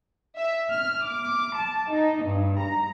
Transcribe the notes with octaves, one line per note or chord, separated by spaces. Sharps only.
E5
F6
D6
A5
D#4
G2
A#5